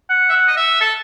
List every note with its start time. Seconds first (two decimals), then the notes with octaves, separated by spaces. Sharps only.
0.10 F#5
0.29 E5
0.32 F#5
0.47 D#5
0.57 E5
0.80 A4